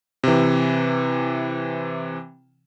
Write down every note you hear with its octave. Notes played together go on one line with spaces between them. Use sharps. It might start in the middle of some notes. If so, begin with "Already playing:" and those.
C3 E3